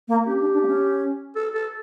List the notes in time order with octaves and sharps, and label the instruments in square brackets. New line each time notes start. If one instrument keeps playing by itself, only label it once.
[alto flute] A#3
[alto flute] C#4 [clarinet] G4
[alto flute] D4
D4
A#3
C#4
[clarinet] A4
A4